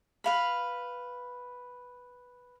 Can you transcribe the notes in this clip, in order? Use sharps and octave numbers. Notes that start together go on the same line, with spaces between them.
B4 F5 B5